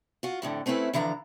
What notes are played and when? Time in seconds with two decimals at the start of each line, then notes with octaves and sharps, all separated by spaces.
0.23 F4 F#4
0.42 F2 A2 D3
0.66 A3 C4 C#4 E4 B4
0.94 D3 E3 F3 A#5